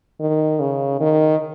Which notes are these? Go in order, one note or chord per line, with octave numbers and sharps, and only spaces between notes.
D#3
C#3
D#3